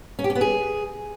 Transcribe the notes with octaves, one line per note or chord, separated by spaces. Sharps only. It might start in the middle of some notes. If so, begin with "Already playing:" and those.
C#4
G4
C#4
B3
G#4